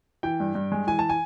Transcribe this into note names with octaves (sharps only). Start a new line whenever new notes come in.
E3 G5
G2
G2
G#3
E3 G#5
A5
G#5